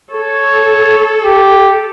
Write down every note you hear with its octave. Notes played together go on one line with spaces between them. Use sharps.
A4 C#5
G4